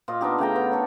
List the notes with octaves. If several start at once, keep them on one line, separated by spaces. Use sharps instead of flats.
A#2 F4 D#5
B3 D4 D#4 G4
C#3 A3 G5 A#5
B3
D4 A4 A#4 C#5